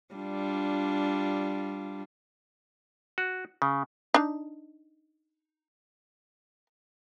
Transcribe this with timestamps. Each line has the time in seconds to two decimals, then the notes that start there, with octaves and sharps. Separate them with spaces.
0.15 G3 D4 F4
3.18 F#4
3.62 C#3
4.14 D4 D#4